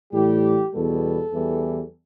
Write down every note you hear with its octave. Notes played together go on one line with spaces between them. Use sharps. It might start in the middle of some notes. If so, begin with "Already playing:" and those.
A2 E3 G3 G4
E2 B2 G3 A4
E2 E3 G3